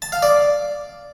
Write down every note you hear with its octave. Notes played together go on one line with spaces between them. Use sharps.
A5
F5
D5